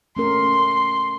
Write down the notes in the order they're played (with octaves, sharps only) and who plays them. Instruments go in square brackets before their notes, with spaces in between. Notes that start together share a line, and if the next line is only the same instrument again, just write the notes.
[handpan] A3 C#4 A#4 [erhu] C6